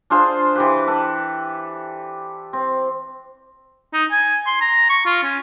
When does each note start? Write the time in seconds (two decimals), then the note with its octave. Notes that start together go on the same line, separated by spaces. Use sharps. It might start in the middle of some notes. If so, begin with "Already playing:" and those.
0.10 D4 F4 G#4 C5
0.55 E3 G4 B4
0.87 A4 B4
2.53 C4
3.94 D#4
4.11 G#5
4.46 C6
4.61 A#5
4.89 C#6
5.06 F4
5.24 C#4